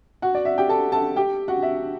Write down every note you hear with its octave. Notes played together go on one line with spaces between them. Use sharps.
F#4 F#5
D5
E5
G4 G5
A4 A5
A4 A5
G4 G5
F#4 F#5
E5